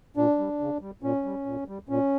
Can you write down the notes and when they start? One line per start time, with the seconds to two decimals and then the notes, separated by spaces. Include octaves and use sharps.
0.16 A#2 D4
0.39 G3
0.60 C#3
0.81 G3
1.03 A#2 C#4
1.25 G3
1.46 A#2
1.68 G3
1.89 A#2 C#4